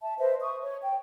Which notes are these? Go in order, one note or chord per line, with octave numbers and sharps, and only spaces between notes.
E5 A5
B4 C5 D#5 E5
C#6 D#6
C#5
G5